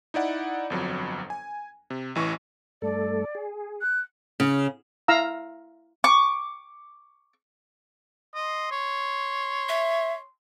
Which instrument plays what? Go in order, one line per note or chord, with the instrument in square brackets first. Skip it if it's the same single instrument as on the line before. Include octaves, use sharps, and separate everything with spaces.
[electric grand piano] D#4 E4 D5 F#5
G1 F2 F#3
G#5
C3
A1 E3 C#6
[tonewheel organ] G2 A3 A4 [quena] D5
[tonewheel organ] G#4
[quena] F#6
[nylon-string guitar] C#3
[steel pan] E4 F5 A#5 E6
[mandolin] C#6 D6
[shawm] D#5 [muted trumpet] C6
[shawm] C#5
[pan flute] E5